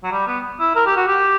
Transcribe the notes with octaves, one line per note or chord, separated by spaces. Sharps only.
F#3
G3
B3
E4
A#4
G4
F#4
G4